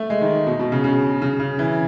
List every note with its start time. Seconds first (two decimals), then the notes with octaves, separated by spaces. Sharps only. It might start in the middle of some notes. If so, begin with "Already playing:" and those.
Already playing: A3
0.10 G#3
0.21 D#3
0.47 B2
0.59 B2
0.72 C#3
0.84 C#3
1.22 C#3
1.40 C#3
1.59 E3